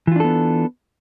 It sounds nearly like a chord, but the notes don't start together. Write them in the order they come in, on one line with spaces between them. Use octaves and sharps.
E3 F4 D4 A4 B3